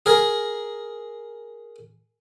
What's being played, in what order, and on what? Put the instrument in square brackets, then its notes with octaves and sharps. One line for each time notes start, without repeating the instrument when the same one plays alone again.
[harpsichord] G#4 A#4